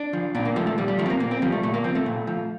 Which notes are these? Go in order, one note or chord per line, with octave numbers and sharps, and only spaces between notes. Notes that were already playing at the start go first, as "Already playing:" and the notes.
Already playing: D4
F3
A#2 D4
A#3
F3 A3
A3
A#2 G3
G3
F3 A3
C4
A#3
A#2 A#3
C4
F3 G3
A3
A#2 A3
A#3
F3 C4
A3
A#2
F3